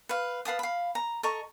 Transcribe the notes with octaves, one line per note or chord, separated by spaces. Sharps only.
B4 F5
B4 F5 A5 D#6
F5 B5
A#5
A4 D#5 A#5 C#6